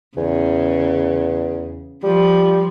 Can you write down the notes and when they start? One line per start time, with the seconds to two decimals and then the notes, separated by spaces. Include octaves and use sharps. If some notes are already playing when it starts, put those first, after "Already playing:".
0.17 E2 C#3
2.03 F3 G3